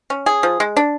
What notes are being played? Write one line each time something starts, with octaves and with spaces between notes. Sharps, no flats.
C#4
G#4
F3
G#3
D4